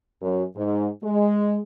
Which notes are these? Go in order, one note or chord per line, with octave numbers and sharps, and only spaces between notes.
F#2
G#2
G#3